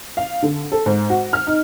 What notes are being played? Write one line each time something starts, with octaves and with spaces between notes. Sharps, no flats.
F5
D3
A4
G#2
F#4
F6
D#4